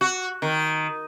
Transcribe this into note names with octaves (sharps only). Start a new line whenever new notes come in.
F#4
D#3